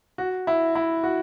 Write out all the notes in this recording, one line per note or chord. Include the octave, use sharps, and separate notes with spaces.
F#4
E4
E4
F#4